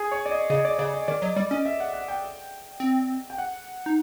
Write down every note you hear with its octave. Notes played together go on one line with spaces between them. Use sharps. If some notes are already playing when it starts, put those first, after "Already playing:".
Already playing: G#4
C#5
D5
D#5
C#3 D#5
D5
C#3 D5
D#5
D#3 D5
F#3 D#5
G3 D5
C#4 D#5
E5
F#5
F#5
G5
C4
G5
F#5
D#4